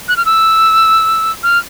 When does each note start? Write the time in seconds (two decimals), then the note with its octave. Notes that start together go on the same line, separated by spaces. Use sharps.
0.08 F#6
0.17 F6
0.26 E6
1.43 F6